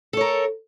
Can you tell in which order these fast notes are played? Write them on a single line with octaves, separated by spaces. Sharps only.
A4 C#5 A#4